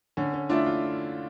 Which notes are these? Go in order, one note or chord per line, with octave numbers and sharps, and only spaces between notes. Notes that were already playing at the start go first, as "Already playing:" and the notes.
D3 C#4
C#4
A3 D4 E4 F4
F4